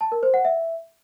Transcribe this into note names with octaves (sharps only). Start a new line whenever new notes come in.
A5
A#4
C5
F#5
E5